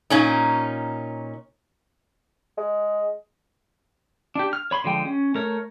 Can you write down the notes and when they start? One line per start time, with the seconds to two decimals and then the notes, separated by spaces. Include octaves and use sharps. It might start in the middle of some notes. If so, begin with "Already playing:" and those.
0.10 A#2 C#4 D#4
2.57 G#3
4.35 D4 G4
4.53 F6
4.71 C#5 B5 C6
4.84 D3 F3 G#3 G5
5.05 C#4
5.35 A3 A#4 C#5